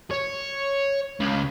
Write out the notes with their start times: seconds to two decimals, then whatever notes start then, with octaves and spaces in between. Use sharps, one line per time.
0.11 C#5
1.20 C#2 C#3